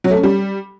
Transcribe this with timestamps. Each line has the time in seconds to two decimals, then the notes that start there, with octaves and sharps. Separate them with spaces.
0.04 F#3
0.11 A3
0.17 C#4
0.23 G3